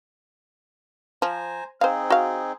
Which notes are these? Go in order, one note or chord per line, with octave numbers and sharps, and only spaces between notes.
F3 C5 G#5 A#5
C4 D#4 G#4 C5 F5
F#4 F5